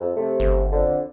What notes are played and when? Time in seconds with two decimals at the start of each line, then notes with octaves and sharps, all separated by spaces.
0.01 F2
0.16 C3 A3
0.40 G1
0.72 F2 D3